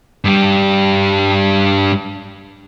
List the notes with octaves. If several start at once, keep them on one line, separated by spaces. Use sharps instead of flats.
G2 G3